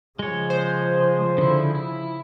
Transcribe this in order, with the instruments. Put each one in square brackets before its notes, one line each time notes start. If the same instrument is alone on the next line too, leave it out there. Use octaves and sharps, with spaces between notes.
[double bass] C#3 F3 [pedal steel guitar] G#3 C#5
[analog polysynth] C5
[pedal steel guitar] D3 E4
E4